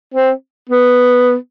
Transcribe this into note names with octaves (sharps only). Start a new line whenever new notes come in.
C4
B3